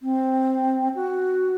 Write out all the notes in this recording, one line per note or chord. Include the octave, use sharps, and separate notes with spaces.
C4
F#4